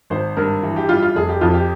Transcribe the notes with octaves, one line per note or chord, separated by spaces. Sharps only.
G#1 C5
G2 A#4
E3
G4
G3 F4
F4
F1 G#4
G4
F2 F4
G4